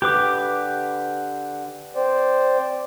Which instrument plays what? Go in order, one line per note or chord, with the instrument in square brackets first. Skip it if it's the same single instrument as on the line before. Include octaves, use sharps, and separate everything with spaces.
[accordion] D3 [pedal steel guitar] G4 B4 D6
[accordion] C4 C5 D5